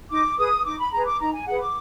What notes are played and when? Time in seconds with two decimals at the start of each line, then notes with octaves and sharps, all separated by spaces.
0.10 D#4 D6
0.37 G#4 B4 D#6
0.64 D#4 D6
0.78 B5
0.92 G#4 B4 A#5
1.05 D6
1.19 D#4 A#5
1.33 G#5
1.46 G#4 B4 F#5
1.60 D6